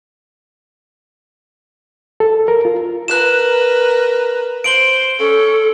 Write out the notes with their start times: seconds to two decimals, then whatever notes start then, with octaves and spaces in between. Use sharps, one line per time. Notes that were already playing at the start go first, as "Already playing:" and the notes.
2.20 A4
2.48 A#4
2.65 F4
3.08 A#4 B4 F#6 E7
4.64 C5 D7 F#7 G7
5.19 C#4 A4